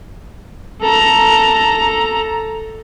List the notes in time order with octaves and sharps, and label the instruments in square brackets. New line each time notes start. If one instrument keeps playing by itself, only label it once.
[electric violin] A4 A#5